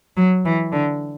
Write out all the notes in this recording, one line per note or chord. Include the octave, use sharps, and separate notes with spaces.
F#3
E3
D3